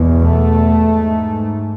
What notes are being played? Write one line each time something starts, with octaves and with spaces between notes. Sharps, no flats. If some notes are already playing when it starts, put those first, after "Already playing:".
Already playing: E2 B2
A3
G#2